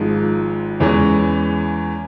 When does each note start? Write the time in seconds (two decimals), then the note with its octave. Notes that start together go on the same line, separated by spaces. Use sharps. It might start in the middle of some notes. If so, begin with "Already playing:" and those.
Already playing: G#1 G#2 F3 G#3
0.80 E2 E3 G#3 C#4